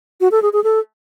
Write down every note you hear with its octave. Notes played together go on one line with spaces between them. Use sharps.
F#4
A4
G#4
G#4
A4